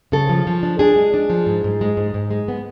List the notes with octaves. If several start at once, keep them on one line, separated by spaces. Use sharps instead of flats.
C#3 A4
F3
F3
D4
D4 G#4
G#3
D4
F3
G#2
G#2
G#3
G#2
G#2
G#3
B3